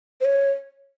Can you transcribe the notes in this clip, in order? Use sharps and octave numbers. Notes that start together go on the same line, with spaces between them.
C5
C#5